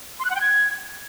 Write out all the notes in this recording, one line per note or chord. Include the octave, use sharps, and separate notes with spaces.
C6
F#6
F#5
G5
G#6